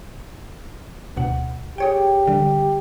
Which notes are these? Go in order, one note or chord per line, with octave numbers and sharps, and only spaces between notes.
D2 B2 F#5
G4 G#4 C#5 G5
D3 G3